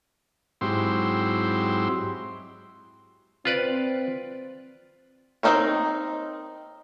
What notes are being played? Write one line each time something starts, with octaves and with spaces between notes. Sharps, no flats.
G#2 F#3 C4 E4 G4 C6
C4 F4 B4 D5
C4 D4 D#4 A#4 C#5